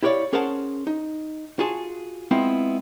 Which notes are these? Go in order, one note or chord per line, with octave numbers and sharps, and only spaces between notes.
E4 G4 A#4 C#5 D5 F5
C#4 G#4 A#4 C5 F#5 A5
D#4
F4 F#4 G#4 A5
G#3 B3 C4 E4 F4